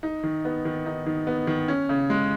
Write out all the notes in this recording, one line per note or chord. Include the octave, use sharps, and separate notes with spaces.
D#4
D#3
B3
D#3
D#4
D#3
B3
D#3
C#4
C#3
G#3